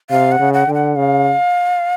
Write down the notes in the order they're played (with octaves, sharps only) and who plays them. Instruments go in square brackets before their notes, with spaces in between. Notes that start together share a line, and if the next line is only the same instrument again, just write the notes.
[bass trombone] C3 [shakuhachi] F5
[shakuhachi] F#5
[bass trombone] C#3
[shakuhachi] F#5
[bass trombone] D3 [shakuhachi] G5
[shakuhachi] F#5
[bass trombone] C#3 [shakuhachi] F5